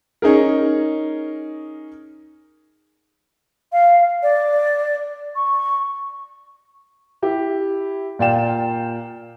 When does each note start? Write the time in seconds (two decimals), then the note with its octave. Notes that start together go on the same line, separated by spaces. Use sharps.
0.22 C#4 D#4 G#4 A#4
3.72 F5
4.23 D5
5.36 C#6
7.22 E4 G4
8.19 A#2 F4 D5 F5 G5 E7